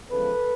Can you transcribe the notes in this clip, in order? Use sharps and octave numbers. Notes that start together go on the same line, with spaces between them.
E2 C#3 F3 G#3 A4 B4